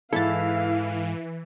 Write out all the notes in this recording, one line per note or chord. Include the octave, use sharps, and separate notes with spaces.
G#2 E3 G#3 E4 A4 F5 A5